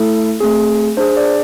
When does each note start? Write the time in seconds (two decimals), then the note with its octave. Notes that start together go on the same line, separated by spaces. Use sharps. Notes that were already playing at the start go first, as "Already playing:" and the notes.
Already playing: A3 E4 A4
0.40 A3 C4 G#4
0.97 D4 G#4 C5
1.17 D5